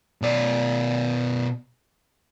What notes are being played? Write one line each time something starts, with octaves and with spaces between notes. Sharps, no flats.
B2 D5